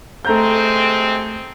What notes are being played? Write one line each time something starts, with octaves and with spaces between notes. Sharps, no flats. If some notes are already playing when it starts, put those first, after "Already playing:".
C3 G#3 A3 C4 A#5 G6